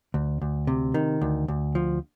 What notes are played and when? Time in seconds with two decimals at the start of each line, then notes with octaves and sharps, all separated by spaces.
0.14 D2
0.42 D2
0.67 C3
0.94 D#3
1.22 D2
1.48 D2
1.75 F3